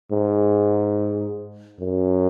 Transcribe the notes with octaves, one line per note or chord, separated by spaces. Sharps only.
G#2
F#2